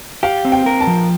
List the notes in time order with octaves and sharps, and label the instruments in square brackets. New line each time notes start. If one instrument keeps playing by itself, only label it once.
[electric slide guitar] G4 [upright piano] F5
[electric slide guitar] C4
[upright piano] G5
[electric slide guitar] A#4
[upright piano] A5
[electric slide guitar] F3